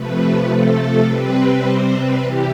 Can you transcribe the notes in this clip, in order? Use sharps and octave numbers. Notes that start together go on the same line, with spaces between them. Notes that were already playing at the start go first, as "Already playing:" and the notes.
Already playing: C3 F3 A3 B4
A4
C3 G3 C4 B4
C5
B4
C3 E3 G3 G4